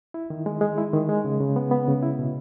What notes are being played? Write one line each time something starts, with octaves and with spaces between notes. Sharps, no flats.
E4
D#3
G#3
G#3
E4
D#3
G#3
C#3
C#3
B3
B3
C#3
E4
B2